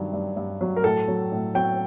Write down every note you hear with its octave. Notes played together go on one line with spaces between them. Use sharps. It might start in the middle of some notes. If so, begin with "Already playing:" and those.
Already playing: G2 D#3 F#3
G2
G2
F#3
A#4
A2 A4
F#3
A2
F#3 G5